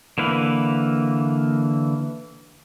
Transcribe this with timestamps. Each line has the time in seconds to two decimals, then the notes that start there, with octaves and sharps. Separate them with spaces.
0.18 D3 E3 A#3 B4